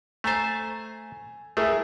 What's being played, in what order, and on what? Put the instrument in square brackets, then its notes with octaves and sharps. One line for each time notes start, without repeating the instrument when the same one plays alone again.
[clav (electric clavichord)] A3 C5 [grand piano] G#5 A#5 A6
[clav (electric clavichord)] A3 [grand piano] E4 G#4 A#4